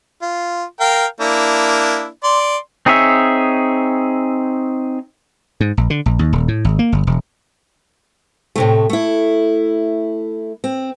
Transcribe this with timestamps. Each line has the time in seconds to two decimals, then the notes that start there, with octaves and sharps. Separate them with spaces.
0.22 F4
0.80 A#4 F5 G5
1.20 A#3 D4 E4
2.24 D5 C6
2.86 C4 D#4 G#4 C#5 E5
5.61 G#2
5.77 A#1
5.90 D3
6.06 A#1
6.19 D#2
6.33 D#1
6.48 A2
6.65 G#1
6.79 A#3
6.92 G1
7.07 E1
8.56 A2 C3 A3
8.89 A3 E4
10.64 C4